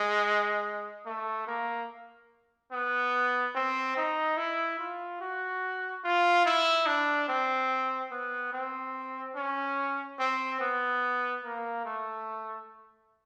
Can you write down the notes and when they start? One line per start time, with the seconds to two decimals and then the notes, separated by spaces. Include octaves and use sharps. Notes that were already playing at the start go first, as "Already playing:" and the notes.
Already playing: G#3
1.06 A3
1.47 A#3
2.72 B3
3.55 C4
3.97 D#4
4.37 E4
4.79 F4
5.21 F#4
6.04 F4
6.46 E4
6.86 D4
7.29 C4
8.11 B3
8.53 C4
9.36 C#4
10.19 C4
10.61 B3
11.44 A#3
11.85 A3